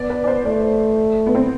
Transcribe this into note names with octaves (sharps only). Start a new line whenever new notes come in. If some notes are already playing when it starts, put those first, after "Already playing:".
Already playing: B3 D5
B4
D5
C5
A3 D5
B3
C4